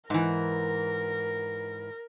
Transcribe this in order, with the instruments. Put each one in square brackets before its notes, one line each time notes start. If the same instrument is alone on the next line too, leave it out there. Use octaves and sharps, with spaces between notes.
[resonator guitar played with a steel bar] G#2 E3 [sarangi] A#4